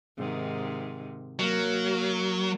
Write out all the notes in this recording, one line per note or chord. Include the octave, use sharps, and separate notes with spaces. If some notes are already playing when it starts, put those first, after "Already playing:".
G#2 C3 D#3
F#3 A#3 A#4